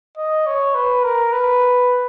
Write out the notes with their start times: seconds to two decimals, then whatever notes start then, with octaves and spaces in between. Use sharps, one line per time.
0.17 D#5
0.46 C#5
0.75 B4
1.04 A#4
1.33 B4